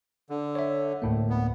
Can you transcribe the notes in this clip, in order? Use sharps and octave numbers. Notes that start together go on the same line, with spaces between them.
D3
C#5 E5
D2 A2 A#3
B3